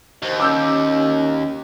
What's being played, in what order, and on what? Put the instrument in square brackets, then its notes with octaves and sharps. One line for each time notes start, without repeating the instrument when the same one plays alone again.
[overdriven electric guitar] D#2 [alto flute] C5
[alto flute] C#4 [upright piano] D6 E6 G6